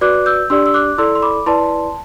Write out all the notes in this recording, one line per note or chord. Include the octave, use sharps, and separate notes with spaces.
F#4 B4 D5 D6 F#6
E6 G6
D4 G4 D5 C6 E6
E6
D6 F#6
E4 A4 D5 C6 E6
C6
B5 D6
E4 B4 D5 A5 C6